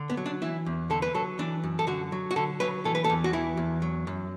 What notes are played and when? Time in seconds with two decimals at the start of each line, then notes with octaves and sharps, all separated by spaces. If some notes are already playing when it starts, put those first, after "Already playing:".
Already playing: D3
0.10 B3
0.17 F#3
0.26 D4
0.42 E3 E4
0.66 E2
0.90 D3 A4
1.02 B4
1.14 F#3 A4
1.39 E3 D4
1.64 F#2
1.79 A4
1.87 D3 F#4
2.12 F#3
2.31 F#4
2.36 D3 A4
2.60 F#3 B4
2.85 E3 A4
2.95 B4
3.04 A4
3.10 E2
3.24 F#4
3.33 E3 E4
3.57 E2
3.82 F#3
4.07 F#2